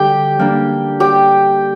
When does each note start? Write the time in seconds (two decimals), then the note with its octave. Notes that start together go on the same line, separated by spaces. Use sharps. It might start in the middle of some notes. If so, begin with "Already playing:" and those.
Already playing: D3 G3 D4 G4 G5
0.39 G3 A#3 D4
1.00 G4 G5